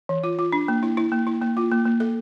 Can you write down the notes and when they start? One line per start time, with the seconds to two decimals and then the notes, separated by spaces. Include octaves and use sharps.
0.09 E3
0.24 F4
0.39 F4
0.53 D4
0.68 A#3
0.83 E4
0.97 E4
1.12 A#3
1.27 E4
1.42 A#3
1.57 F4
1.71 A#3
1.85 A#3
2.00 A4